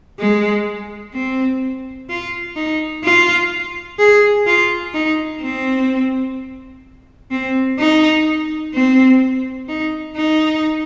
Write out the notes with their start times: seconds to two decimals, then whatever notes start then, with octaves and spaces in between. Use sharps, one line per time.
0.19 G#3
1.14 C4
2.09 F4
2.56 D#4
3.03 F4
3.99 G#4
4.47 F4
4.94 D#4
5.41 C4
7.31 C4
7.79 D#4
8.74 C4
9.69 D#4
10.16 D#4